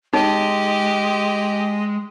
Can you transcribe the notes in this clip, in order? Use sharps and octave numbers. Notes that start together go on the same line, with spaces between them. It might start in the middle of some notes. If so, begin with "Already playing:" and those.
G#3 D#4 G4 D#5